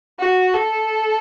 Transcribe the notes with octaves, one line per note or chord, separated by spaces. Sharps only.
F#4
A4